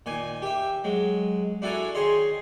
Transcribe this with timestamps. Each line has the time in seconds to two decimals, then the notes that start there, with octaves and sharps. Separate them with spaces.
0.06 A#2 D#3 G#5
0.42 G4 E5
0.84 F#3 G#3
1.62 D4 E4 F#4 A4 G#5 A#5
1.94 D#3 G#4 C#5 D#5 C6